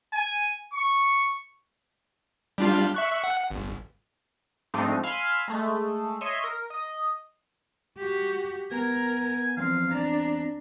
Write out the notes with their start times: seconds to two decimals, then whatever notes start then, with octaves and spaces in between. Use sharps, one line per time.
0.13 G#5
0.73 C#6
2.58 G3 D4 F4
2.95 E5 C#6 F#6
3.24 F#5
3.50 G1
4.74 G#2 F3 A3 C4 D4 D#4
5.03 F5 G#5 B5 C6 E6 F6
5.48 G#3 A3
6.21 C#5 D#5 E5 C6 C7 C#7
6.44 A#4
6.70 D#5
7.98 F#4 G4
8.71 B3 A#4 G#5
9.57 E2 F3 C4 F5
9.91 D4 A#5